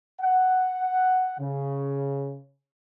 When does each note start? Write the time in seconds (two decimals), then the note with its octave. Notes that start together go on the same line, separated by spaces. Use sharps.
0.20 F#5
1.40 C#3